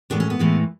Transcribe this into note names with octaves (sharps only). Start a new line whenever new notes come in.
A2 E3 G#3 B3 D4
C#4
B3
A2 E3 G#3